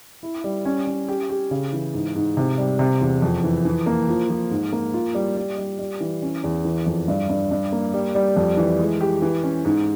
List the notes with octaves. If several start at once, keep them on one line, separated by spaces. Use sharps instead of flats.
E4
G3
C#4
C#4
G4
G4
C#3
E3
G#2
G#2
C3
G3
C3
E2
F2
E3
E3
A#3
F3
F3
G#2
A#3
F4
G3
G3
G3
G3
E3
C#4
E2
E3
F2
G2
G2
G2
A#3
G3
G3
F2
E3
G#3
G4
E3
C#4
G#2